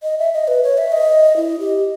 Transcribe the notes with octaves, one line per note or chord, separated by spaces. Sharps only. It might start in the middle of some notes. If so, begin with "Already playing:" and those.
D#5
E5
D#5
B4
C#5
E5
D#5
E4
G4